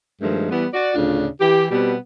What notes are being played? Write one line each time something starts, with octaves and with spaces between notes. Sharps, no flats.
G2 D#3 F3 G#3 A3
E3 G3 B3
F#4 D5
D2 A2 C#3 D4 F4
E3 G4
B2 G3 B3 C4 G4